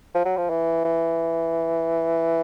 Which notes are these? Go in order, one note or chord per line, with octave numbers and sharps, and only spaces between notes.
F3
F#3
F3
E3
E3